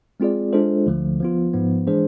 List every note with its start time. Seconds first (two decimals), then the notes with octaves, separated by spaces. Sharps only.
0.20 G#3 C4 F4 G#4 D5
0.53 G#3 D4 F4 A4 C5
0.87 D2 D3 F3 A3
1.20 F3 B3 F4
1.53 G#2 F3 B3
1.87 E3 G#3 D4 G#4 C5